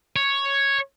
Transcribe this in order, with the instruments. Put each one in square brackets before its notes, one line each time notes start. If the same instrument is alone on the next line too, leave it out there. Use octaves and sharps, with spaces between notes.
[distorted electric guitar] C#5